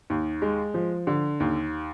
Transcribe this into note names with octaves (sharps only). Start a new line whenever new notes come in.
D#2
G#3
F3
D3
D#2